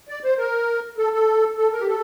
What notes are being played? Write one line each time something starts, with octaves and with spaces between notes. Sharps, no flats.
D5
C5
A#4
A4
A4
A4
A#4
G4
A4